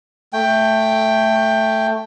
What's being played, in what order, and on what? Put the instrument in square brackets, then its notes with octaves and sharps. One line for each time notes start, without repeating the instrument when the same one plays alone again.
[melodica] A3 G5